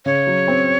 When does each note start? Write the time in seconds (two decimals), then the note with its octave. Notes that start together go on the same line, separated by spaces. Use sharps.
0.05 C#3 C#5
0.27 F#3
0.48 C4